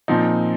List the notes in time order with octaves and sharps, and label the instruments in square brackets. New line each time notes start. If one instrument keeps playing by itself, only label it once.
[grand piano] A#2 F3 C4 D#4